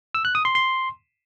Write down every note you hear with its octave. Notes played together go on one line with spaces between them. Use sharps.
E6
F#6
D#6
C6
C6